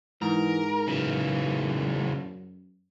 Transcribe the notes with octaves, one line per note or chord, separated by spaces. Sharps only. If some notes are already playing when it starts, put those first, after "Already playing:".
G#2 E3 A#4
F#2 C#3 E3